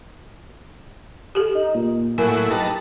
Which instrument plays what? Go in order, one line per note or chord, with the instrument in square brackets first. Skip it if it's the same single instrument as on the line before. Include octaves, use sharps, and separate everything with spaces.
[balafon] G4 A4
[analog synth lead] D#4
A#2
[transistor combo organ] A2 F#3 E4 [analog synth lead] A#3 [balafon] G#5
[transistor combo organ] D#4 B4 A5 [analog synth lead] G4